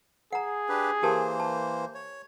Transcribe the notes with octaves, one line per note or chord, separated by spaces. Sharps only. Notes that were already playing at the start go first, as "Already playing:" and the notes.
G#4 F#5 A#5
D4 G4 B4
E3 A#3 G4 A#4 C5 A5
A5
C#5